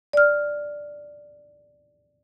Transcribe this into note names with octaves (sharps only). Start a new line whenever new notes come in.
D5 F6